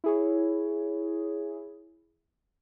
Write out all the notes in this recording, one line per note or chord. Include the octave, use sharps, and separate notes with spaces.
E4 G#4 C#5